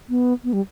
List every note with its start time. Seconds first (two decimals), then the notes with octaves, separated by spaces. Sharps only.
0.09 B3
0.44 B3
0.53 G3